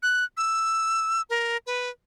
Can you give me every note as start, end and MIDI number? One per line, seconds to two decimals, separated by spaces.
0.03 0.24 90
0.37 1.22 88
1.30 1.57 70
1.67 1.90 71